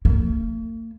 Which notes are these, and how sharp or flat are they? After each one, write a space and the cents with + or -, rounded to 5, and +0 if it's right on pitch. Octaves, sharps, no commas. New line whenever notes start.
A#3 -45